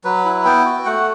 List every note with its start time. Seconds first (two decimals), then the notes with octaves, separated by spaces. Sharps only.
0.04 F#3 B4
0.25 E4
0.45 B3 G5
0.65 F#4
0.86 A3 F#5